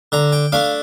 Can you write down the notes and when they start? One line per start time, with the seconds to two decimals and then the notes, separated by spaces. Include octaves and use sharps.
0.12 D3 A#5
0.32 G5
0.52 A3 D4 F5